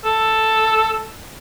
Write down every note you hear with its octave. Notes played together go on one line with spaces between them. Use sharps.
A4